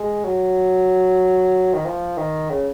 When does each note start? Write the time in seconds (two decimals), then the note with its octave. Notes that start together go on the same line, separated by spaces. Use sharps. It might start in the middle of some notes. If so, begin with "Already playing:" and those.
Already playing: G#3
0.24 F#3
1.74 D#3
1.85 F3
2.17 D#3
2.50 C#3